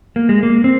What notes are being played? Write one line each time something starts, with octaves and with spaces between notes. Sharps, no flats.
A#3
G#3
A#3
C4